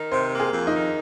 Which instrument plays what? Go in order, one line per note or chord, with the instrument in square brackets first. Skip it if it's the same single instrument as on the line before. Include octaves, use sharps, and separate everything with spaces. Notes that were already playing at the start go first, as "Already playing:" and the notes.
Already playing: [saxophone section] D#3
[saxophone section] C3 [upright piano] C5
[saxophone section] A#3
[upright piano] G#4
[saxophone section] F2
[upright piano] D#4
[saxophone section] D#3